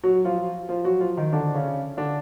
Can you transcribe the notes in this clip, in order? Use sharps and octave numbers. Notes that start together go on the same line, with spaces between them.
F#3 F#4
F3 F4
F3 F4
F#3 F#4
F3 F4
D#3 D#4
D3 D4
C#3 C#4
D3 D4